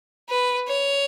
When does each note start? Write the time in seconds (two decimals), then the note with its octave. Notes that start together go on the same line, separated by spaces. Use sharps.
0.29 B4
0.68 C#5